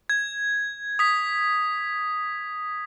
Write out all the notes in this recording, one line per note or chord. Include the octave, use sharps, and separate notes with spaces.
G#6
D#6 B6